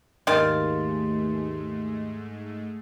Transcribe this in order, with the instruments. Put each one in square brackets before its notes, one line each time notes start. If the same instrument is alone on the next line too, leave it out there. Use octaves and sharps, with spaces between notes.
[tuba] D#2 [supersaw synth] G#2 G#3 A3 [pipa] D#3 F5 [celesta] C6 A6